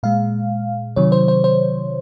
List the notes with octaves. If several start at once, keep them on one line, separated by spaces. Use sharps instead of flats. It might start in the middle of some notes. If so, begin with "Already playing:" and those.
A#2 G#3 F5
C3 D#3 F#3 C#5
C5
C5
C5